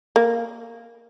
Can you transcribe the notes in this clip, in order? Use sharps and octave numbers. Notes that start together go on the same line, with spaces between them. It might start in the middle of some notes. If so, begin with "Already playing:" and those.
A#3